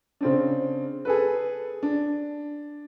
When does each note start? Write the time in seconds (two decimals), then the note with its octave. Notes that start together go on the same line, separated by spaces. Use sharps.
0.21 C#3 C4 D4
1.05 G#4 A4 B4
1.83 D4